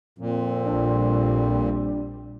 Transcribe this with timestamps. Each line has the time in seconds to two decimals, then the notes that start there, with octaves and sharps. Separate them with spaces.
0.18 F2 A#2 C4
0.65 A#1 G3 D4